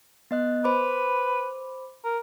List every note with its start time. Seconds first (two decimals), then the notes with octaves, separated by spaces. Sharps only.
0.31 B3 D#5 F#6
0.64 B4 C5 B5 D6
2.04 A#4